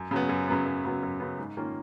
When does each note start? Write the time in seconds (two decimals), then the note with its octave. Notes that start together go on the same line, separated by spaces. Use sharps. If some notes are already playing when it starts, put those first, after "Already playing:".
Already playing: F#2
0.11 C#3 F#3 B3
0.29 F#2
0.48 C#3 F#3 B3
0.66 F#2
0.84 C#3 F#3 B3
1.03 F#2
1.20 C#3 F#3 B3
1.38 G#2
1.57 D#3 A#3 C#4 F4